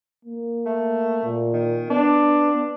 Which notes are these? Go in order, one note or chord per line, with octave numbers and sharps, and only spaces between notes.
A#3
A3
A#2
D#3
B3 D4